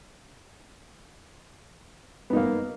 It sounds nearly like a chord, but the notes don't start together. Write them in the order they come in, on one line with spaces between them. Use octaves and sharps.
B3 D#4 A#3